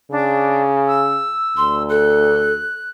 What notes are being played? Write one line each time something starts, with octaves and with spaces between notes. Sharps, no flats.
C#3 D4
E6
D2 C6
A4 F#6